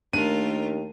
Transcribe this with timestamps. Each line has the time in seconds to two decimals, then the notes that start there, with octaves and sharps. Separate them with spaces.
0.13 D#2 A3 D4 F4 A#4 D#7